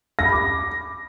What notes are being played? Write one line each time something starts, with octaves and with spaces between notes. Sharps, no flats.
A#6
B5
D6